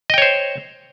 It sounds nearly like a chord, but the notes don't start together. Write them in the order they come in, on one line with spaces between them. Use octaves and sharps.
D#5 G5 C#5 C5